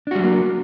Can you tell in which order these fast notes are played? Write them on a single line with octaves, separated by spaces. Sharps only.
D4 F#4 G3 F#3 A#3